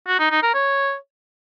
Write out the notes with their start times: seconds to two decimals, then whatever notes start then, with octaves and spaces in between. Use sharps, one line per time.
0.07 F#4
0.19 D#4
0.31 D#4
0.42 A#4
0.54 C#5